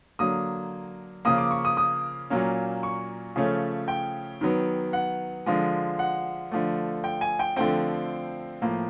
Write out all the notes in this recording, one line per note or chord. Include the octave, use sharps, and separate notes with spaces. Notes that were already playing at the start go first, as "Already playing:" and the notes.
D3 F#3 A#3 D#6
C#3 F3 A#3 D#6
D6
C#6
D#6
D#6
A#2 F#3 A#3 C#4
C#6
C#3 F3 A3 C#4
G5
D#3 F#3 B3
F#5
D3 F3 G#3
F#5
D3 F3 A3
G5
G#5
G5
D3 F3 A3 C4 G5
A2 F3 A#3